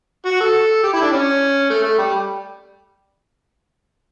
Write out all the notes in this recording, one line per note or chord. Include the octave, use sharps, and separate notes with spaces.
F#4
A4
G4
E4
D4
C#4
A3
A3
G3